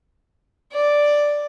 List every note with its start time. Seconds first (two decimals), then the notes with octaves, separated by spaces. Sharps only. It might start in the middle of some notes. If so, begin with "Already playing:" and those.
0.72 D5